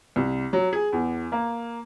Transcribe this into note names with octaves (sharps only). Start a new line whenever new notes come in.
C2
F#3
G#4
E2
A#3